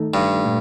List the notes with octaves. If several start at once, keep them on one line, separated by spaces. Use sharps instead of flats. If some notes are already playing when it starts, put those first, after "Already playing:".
Already playing: D#3 A3 D#4 A4
G2
A#2 A3